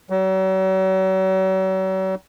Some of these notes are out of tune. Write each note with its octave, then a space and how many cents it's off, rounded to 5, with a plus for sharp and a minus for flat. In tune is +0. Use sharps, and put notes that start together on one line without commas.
F#3 +40